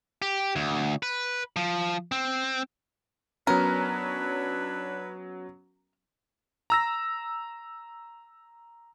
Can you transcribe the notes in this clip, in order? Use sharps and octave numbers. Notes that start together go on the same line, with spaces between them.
G4
D2
B4
F3
C4
F#3 B3 C#4 D4 A#4 B4 C#5
A#5 E6 A#6